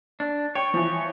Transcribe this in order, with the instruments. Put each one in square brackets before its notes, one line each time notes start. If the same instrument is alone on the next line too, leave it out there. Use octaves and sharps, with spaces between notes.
[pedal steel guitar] D4
[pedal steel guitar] C#5 [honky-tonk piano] G5
[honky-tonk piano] E3 F3